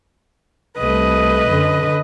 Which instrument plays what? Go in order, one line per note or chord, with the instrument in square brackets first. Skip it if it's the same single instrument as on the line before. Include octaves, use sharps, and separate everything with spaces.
[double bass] C2 A3 [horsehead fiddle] B4 D#5
[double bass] F#2 D3